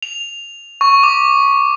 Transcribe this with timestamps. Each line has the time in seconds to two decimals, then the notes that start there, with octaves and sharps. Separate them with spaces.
0.03 F7
0.81 C#6
1.03 D6